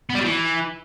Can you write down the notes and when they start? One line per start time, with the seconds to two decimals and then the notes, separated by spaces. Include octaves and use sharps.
0.10 B3
0.15 G3
0.20 F#3
0.25 E3